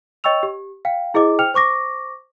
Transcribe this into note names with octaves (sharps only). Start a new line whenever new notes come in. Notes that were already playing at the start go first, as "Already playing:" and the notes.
C#5 D#5 G5 C#6 E6 F7
G4
F5 G5
E4 G#4 C5 D#5 D6
C5 G5 F6 F7
C5 C#6 D6 A#6